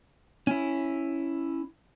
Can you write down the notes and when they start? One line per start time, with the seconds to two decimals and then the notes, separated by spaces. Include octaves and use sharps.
0.47 C#4 E4